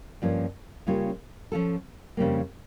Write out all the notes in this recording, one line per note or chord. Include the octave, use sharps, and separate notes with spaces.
G2 F3 A#3 C#4 F4
C#3 G3 A#3 C#4 F4
F3 C#4 F4 A4
F2 C#3 G3 A#3